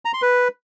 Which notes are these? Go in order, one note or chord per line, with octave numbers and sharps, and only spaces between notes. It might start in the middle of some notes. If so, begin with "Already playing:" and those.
A#5
C6
B4